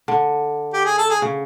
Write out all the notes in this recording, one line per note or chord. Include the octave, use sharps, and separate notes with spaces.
D3
G4
G#4
A4
G#4
C#3